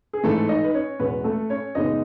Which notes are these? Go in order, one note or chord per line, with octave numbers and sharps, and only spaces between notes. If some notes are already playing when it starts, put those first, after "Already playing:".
G#4
G#2 E3 G#3 A3 A4
D#4 D#5
B4
C#4 C#5
E2 B2 G#3 B3 B4
A3 A4
C#4 C#5
F#2 C#3 G#3 B3 D#4 D#5